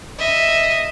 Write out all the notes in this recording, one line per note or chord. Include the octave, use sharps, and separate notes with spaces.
D#5 E5